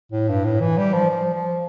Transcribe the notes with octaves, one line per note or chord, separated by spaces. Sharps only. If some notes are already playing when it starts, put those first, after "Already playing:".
A2
G2
A2
E3
G3
F3
F3
F3